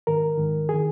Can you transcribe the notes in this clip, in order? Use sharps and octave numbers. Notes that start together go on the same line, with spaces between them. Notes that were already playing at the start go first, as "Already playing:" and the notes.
G#2 D#3 A#4
G#2 D#3
D#3 G#4